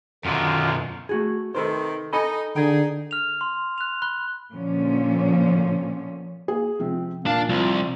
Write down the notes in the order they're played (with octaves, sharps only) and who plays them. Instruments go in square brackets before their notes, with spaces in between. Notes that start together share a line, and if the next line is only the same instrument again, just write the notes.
[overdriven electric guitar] F#2 B2 [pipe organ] D3 D#3 F4
[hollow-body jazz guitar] A3 F#4 G#4
[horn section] C3 D#3 [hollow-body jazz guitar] A4 B4 C5
[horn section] D#4 D#5 [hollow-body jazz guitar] A4 G#5 B5
[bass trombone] D3 [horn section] D#4 G#4 [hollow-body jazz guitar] G5
[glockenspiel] F6 F7
C6
F#6 F7
B5 F#6 G7
[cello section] A#2 D3 F3 C#4
[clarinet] A#3 [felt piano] G#4
[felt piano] C3 F3 [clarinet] C4
[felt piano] A#2 [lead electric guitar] D4 A5 [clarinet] F5
[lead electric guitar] C2 [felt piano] F3 [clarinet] F4